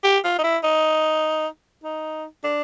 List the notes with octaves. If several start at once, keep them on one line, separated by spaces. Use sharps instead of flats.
G4
F4
D#4
E4
D#4
D#4
D4